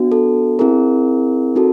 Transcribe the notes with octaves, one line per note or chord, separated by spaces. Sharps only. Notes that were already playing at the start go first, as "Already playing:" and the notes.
Already playing: B3 D4 F#4
A4
C4 E4 G#4 A#4
C4 D#4 F#4 A4